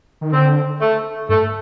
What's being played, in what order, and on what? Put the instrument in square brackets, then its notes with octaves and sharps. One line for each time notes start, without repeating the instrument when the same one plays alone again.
[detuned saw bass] D#3
[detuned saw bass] D3 [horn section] C4
[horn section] A3
[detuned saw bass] G2 [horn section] A3